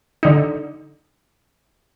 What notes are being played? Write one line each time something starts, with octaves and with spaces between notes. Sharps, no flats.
D3 D#4